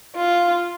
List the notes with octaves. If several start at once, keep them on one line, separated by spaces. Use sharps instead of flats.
F4